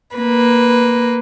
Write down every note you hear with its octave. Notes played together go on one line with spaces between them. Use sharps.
A#3 B4